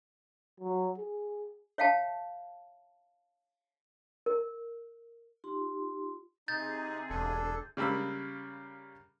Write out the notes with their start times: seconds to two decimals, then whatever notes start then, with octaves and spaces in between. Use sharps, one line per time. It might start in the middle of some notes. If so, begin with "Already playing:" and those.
0.60 F#3
0.98 G#4
1.78 C#5 E5 F5 G5 A5
4.26 A#4
5.44 D#4 F4 G4 C6
6.48 C3 D#4 G#4 G6 A6
7.10 E1 D4 A4
7.77 C#3 G3 A#3 B5 E6